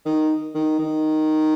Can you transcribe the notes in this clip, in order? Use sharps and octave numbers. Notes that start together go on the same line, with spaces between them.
D#3
D#3
D#3